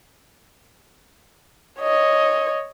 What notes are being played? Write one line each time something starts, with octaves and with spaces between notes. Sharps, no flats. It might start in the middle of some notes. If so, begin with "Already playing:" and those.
C#5 D#5